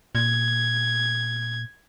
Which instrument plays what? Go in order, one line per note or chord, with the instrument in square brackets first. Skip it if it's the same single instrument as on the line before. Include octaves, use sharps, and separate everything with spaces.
[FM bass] A#2 [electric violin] G#6